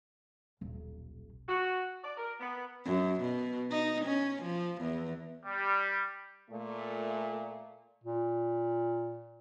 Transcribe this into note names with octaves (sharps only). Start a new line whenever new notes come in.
D#1 B1
F#4
D5
A#4
B3
F#2
B2
D#4
C#4
F3
E2
G3
A#2 A3
A#2